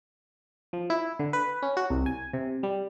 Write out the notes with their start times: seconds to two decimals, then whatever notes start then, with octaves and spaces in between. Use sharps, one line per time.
0.73 F3
0.90 E4
1.19 D3
1.33 B4
1.62 C#4
1.77 F#4
1.90 C2
2.06 G#5
2.33 C3
2.63 G3